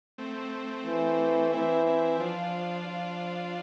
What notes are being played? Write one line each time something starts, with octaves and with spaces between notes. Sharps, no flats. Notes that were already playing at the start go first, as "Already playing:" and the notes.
A3 C4
E3
E3 C4 E4
C4 E4
F3 D4 F4
F3